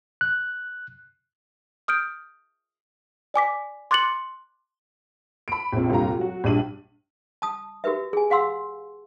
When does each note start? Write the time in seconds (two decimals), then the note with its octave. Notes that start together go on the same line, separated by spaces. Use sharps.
0.21 F#6
1.88 D#6 F6 G6 D7
3.34 D5 G#5 D6 B6
3.91 C6 D6 F#6 A6 C#7 F#7
5.48 B5 D7
5.73 A#1 F2
5.90 F1 G2 A#2 F4 A#5
6.17 F#3 F#4
6.44 A#1 G2 D4 D#7 F#7
7.42 A5 D#6
7.84 F#4 G4 A#4 B4 E5
8.13 G#4 G#5
8.30 G#4 F5 F#5 C6 E6